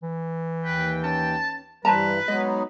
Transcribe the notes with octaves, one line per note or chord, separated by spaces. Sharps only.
E3
D#2 B4 G5
C#4 A5
G2 E3 G3 B4 C5 A5 A#5
F#3 G#3 B3 D#4 D#5